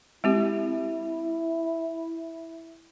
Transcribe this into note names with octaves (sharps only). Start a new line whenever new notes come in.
G#3 C4 E4 G4